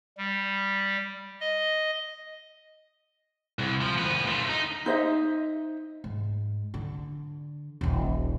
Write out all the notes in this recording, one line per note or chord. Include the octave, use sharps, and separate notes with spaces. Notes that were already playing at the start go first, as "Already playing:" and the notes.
G3
D#5
C2
F3
D2 B3
A3 F4
D#4
D#4 C5 D#5 E5
G#2
D3
D#1 A#1